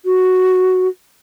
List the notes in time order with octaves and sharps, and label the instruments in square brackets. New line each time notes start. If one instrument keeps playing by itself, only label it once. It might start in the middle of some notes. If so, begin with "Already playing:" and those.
[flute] F#4